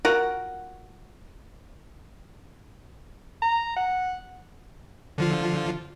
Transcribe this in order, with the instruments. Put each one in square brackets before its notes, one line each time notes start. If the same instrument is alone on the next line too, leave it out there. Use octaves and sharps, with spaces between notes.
[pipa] F4 F#4 A#4 F#5
[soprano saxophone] A#5
F#5
[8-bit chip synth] D3 F3 F4